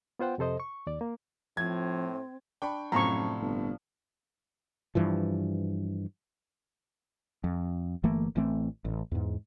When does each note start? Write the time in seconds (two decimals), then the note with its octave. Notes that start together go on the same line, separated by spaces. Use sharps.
0.19 B3 F4 C5 F#5 G5
0.38 F2 C3 A4 C5 D#5
0.60 C#6
0.87 D#2 D5
1.01 A#3
1.57 A2 F3 C4 G#6
2.62 D4 G5 B5 C#6
2.92 F#2 A2 C3 F3 A#5 C#6
3.41 G1
4.95 G2 E3 F3
7.44 F2
8.04 G1 E3 A3 A#3
8.36 A1 E3 A3 C4
8.85 A1
9.12 E2 G#2